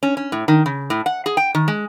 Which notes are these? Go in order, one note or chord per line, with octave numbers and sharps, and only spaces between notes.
C#4
C#4
A2
D#3
C#3
A2
F#5
G#4
G5
D#3
G#3